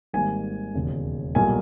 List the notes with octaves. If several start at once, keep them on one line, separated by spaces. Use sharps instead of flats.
G#1 G#2 G3 A#3 G#5
E1 D#2 C#3
B1 A#2 G3 A#3 G#5